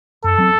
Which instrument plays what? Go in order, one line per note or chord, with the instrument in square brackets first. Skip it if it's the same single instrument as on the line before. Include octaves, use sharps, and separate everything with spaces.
[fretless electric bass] F#2 [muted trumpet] A4
[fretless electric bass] F#3 C4